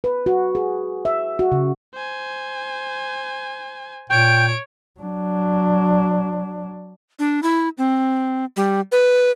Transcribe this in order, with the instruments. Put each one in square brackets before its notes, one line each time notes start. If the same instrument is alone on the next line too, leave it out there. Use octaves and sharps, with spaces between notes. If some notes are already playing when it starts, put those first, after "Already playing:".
[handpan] B4
F#4
G#4
E5
F#4
C#3
[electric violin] C5 G#5
[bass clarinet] A#2 [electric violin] C#5 D7 [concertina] G5
[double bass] F#3 D4
[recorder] D4
E4
C4
G3
B4